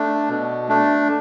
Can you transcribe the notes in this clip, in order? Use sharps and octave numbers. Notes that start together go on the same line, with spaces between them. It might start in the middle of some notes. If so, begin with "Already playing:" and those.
Already playing: A3 D4
B2
A3 D4